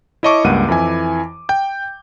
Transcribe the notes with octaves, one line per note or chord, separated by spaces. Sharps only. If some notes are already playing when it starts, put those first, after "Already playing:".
E4 C#5 D#5 A5 C#6 D6
C#2 G2 A#3 F#5 D#7
F2 E3 E4 G#5
G5 G6